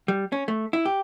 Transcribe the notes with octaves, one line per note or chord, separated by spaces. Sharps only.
G3
C#4
A3
E4
G4